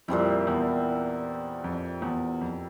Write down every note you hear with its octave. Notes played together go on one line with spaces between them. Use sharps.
F2 A#2 G3 C4 E4
E2
F2
E2
F2